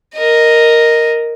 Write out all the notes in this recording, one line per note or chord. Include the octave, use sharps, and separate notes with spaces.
A#4 D#5